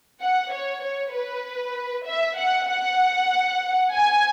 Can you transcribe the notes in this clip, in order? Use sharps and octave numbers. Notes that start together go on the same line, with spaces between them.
F#5
C#5
C#5
B4
E5
F#5
F#5
G#5